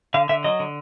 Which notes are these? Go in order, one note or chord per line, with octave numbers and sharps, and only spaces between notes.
D3 F5
D3 E5
F#3 D#5
D3